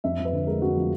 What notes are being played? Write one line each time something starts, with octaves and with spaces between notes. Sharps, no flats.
F2 E5
F3
B4
D3
G#3 A#4
F2 F#4
F3